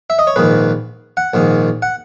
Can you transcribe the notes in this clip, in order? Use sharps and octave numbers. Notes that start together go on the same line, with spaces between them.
E5
D#5
C#5
A#1 G#2 D#3 B4
F#5
A#1 G#2 D#3
F#5